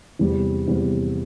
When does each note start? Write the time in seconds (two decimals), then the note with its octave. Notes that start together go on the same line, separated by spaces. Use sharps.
0.19 E2 C3 G3
0.68 E2 C3 G3